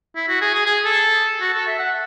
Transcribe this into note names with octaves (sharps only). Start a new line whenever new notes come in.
E4
F#4
G#4
G#4
G#4
A4
F#4
A4
E5
F#5